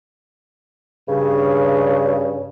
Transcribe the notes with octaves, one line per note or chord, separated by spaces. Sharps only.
G2 C#3